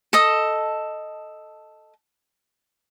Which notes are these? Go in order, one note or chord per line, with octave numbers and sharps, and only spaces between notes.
A4 D#5